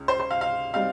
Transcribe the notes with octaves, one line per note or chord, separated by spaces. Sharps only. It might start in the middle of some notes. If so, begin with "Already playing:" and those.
Already playing: C#2 C#3
C5
C5
F5
F5
G3 C4 D#4 F5